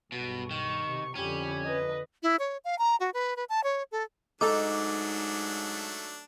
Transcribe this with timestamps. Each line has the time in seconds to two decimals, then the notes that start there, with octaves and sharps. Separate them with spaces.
0.12 B1 G2 B2
0.51 D#3 C#6
0.86 C3
1.16 F2 D3 C#4 G4 B5
1.64 B4 D#5
2.23 E4
2.39 C#5
2.64 F5
2.79 A#5
3.00 F#4
3.14 B4
3.36 B4
3.49 A5
3.64 C#5
3.92 A4
4.41 G#2 F#3 A3 D4 D#4 A4 D6